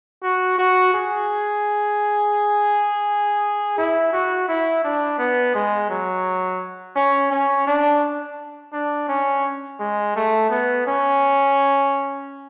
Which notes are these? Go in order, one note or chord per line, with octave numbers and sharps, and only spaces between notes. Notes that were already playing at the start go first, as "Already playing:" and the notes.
F#4
F#4
G#4
E4
F#4
E4
D4
B3
G#3
F#3
C#4
C#4
D4
D4
C#4
G#3
A3
B3
C#4